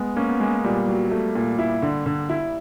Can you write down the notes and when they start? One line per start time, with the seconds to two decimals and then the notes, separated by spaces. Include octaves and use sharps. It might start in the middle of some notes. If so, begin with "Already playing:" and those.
Already playing: G#3 B3
0.16 A#3 C#4
0.29 B3
0.40 G#3 A#3
0.64 A#2 G3
0.88 F#3
1.11 A3
1.35 A#2
1.58 E4
1.82 D3
2.06 D3
2.29 E4